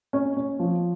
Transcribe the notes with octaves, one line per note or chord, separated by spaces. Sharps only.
C#4
C#4
F3